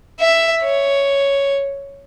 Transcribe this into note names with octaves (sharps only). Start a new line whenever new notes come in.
E5
C#5